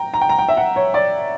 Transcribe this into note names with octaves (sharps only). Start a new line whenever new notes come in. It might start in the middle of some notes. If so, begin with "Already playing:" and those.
Already playing: G5 A#5
A#5
G5
A#5
G5
E5
F#5
C#5
D5